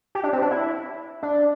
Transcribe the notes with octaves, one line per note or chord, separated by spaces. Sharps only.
G4
D4
C4
D4
E4
D4